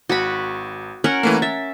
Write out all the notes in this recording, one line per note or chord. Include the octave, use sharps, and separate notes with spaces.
G#1 F#4 B5
C#4 A#4 F#5
E3 A3 A#3
E5 A6